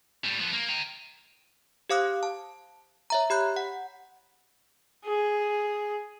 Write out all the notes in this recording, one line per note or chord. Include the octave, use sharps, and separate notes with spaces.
A2 G3
F3 B3
A#3
G5 A#5
G4 C5 F5 D6 D#6 F#6
A5
C#5 E5 A#5
G4 B5 F#6 G6
F#5
G#4